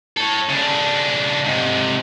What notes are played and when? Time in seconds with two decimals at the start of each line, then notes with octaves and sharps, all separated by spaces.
0.17 A4 C#5
0.50 C#3 D4
1.46 G#2 C3